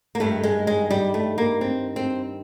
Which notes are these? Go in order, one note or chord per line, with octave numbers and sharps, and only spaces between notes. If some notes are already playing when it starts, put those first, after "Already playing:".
A#3
G2 D#3 A3
G#3
G#3
G3
A3
A#3
C4
C4